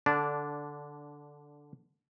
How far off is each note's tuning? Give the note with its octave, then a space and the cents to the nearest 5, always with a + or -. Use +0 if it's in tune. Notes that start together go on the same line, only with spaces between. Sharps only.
D3 +0 D4 -15